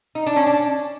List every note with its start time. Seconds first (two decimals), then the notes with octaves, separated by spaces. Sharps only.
0.15 D#4
0.26 D4
0.36 C#4
0.46 D4